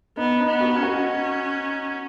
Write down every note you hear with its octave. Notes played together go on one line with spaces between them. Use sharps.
B3 D#4
D#4
B3
F#4
C#4
F#4